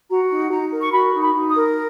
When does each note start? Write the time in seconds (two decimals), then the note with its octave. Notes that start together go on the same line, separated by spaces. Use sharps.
0.09 F#4 A#5
0.31 D#4
0.51 D#4 A#5
0.72 A#4
0.82 C#6
0.93 F#4 B5
1.14 D#4
1.21 B5
1.35 D#4
1.49 D#6
1.55 A#4